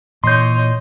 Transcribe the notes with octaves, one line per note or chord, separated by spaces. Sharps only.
A#2 E3 C#5 D#5 C6 G6